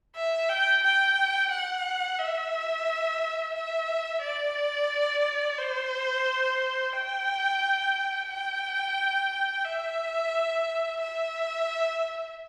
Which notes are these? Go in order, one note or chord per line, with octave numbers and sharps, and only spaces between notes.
E5
G5
G5
F#5
E5
E5
D5
C5
G5
G5
E5
E5